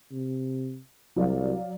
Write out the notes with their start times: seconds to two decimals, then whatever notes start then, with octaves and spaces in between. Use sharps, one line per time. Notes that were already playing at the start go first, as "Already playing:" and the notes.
0.12 C3
1.16 C2 F#3 D5 F5